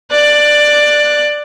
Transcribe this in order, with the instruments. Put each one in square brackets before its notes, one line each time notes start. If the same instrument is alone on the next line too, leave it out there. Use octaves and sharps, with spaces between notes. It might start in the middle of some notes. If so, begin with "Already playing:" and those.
[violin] D5 F#6